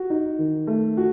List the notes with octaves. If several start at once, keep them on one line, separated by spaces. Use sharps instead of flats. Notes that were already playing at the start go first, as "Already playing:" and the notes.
Already playing: F#4
D#4
D#3
A3
F#4